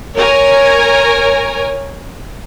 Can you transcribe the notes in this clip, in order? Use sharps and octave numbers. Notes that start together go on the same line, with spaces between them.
A#4 C#5 G#5 A#5